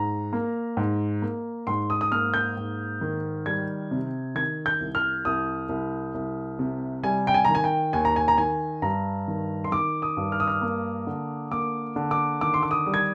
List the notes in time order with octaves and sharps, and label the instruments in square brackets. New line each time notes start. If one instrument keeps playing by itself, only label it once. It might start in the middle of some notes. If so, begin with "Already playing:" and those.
Already playing: [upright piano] G#2 A#5
A#3
G#2
A#3
G#2 C6
D#6
D#6
A#3 F6
G6
G#2
D#3
G3 G#6
C3
D#3 G#6
G6
C2
F6
C2 D#6
C2
C2
C3
G3 G#5
G5
G#5
D#3 A#5
G#5
G5
D#2 G#5
A#5
G#5
A#5
D#3 G#5
G2 A#5
D#3
C6
D#3 D6
D#6
G2
F6
D#6
F6
A#3
D3
A#3 D6
D3
D6
D#3 D6
C6
D6
D#6
G3
G#6